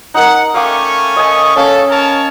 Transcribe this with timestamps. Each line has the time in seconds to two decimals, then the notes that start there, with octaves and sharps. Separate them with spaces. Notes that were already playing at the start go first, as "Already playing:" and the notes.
0.14 D#4 A#4 F#5
0.54 A3 C#4 F5 G5 C#6 D6
1.16 D#5 G#5
1.55 A3 C#4 A4 F5
1.90 A#4 C#5 A5